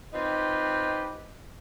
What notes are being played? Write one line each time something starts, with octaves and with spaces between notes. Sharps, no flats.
C4 D#4 F4 G4 B4